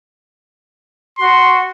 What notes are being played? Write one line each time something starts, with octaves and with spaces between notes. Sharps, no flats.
F#4 C6